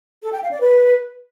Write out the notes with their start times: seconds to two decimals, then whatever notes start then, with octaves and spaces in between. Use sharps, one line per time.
0.23 A4
0.33 G5
0.42 F5
0.52 D5
0.61 B4